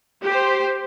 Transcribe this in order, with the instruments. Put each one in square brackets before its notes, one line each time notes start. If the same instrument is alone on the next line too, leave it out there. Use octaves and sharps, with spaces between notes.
[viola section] G4 C5